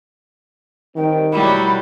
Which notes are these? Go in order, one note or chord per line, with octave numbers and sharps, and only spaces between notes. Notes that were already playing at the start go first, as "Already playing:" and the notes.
D#3 G3 C4 G5
B2 F#3 G3 E4 B5